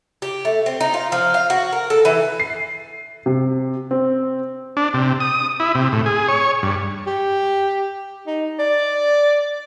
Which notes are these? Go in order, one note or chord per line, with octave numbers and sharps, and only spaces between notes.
G4
A3
C4
D#4
F4
F3
F5
F#4
A#4
A4
E3
C7
C3
C4
D4
C3
D#6
E4
C3
A2
G#4
C#5
G2
G4
D#4
D5